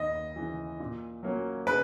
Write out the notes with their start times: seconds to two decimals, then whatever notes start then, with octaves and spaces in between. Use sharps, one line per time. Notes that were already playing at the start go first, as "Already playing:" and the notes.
Already playing: D#2 D#5
0.36 C#3 E3
0.80 A#2
1.23 F#3 A#3 C#4
1.67 C#3 B4